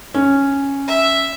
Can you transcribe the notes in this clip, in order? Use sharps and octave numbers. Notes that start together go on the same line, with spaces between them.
C#4
E5